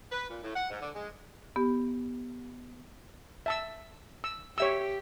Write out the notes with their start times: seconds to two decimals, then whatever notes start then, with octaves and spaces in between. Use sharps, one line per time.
0.12 B4
0.30 A#2
0.43 A2
0.55 F#5
0.69 G#2
0.81 D3
0.95 G#3
1.56 B3 G4
3.46 E5 A5 E6
4.24 E6
4.58 G4 C#5 E5 E6